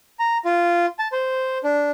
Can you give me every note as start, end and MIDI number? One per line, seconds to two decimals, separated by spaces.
0.19 0.38 82
0.45 0.86 65
0.99 1.08 81
1.12 1.58 72
1.64 1.91 62